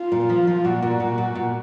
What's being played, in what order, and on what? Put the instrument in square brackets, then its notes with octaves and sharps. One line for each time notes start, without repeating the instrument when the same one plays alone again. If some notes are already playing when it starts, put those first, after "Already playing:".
Already playing: [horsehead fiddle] F4
[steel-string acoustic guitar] A#2
F3
F3
[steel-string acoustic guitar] A#2 [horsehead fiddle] F#4
[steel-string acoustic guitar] A#2
A#2
A#2
A#2